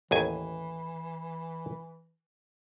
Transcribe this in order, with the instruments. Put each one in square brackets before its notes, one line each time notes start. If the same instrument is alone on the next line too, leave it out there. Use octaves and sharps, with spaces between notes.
[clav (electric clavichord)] A1 D#2 G#5 [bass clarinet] E3